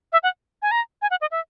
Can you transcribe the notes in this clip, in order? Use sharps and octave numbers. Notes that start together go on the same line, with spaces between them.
E5
F#5
G#5
A#5
G#5
F#5
D#5
E5